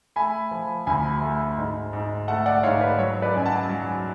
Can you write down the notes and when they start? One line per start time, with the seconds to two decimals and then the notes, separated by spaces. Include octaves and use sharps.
0.16 A3 G#5 B5
0.51 F3
0.87 D2 G#5 B5
1.22 A3
1.57 G#2
1.93 G#2
2.28 A3 F#5 A5
2.46 D5 F#5
2.63 G#2 C#5 F5
2.81 B4 D5
2.98 F#3 C#5
3.22 B4 D5
3.34 F#2 G#5
3.46 F#5 A5
3.69 F#3